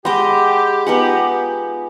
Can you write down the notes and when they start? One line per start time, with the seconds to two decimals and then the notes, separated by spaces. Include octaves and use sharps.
0.05 G#3 G4 G#4 D#5 F#5 B5 D6
0.87 B3 D#4 F4 F#5 G#5